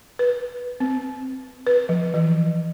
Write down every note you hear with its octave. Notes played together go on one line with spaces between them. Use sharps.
B4
C4
B4
F3
E3